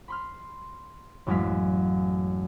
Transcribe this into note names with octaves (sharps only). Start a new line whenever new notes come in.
B5 C6 F6
A1 F#2 F#3 G#3 F5 B6